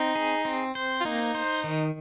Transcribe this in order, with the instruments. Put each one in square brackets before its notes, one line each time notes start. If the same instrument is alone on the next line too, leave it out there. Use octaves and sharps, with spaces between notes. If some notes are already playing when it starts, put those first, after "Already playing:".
Already playing: [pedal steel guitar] C4 [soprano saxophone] D#4
[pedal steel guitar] G#4
C4
C5
[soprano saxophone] F4
[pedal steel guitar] A#3 [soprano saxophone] D#4
[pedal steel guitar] C5
D#3